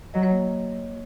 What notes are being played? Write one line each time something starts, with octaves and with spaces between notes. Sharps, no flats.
F#3 D#5
C#5
A#3